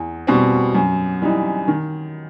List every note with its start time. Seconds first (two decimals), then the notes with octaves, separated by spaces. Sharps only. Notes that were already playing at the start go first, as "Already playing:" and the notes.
Already playing: E2
0.27 B2 G3 C4
0.75 F#2
1.22 E3 G3 D#4
1.68 D#3